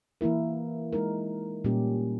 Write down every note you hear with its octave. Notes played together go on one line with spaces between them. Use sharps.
E3 A#3 E4 A#4
G#3 D#4 A#4
A#2 G3 C#4 G4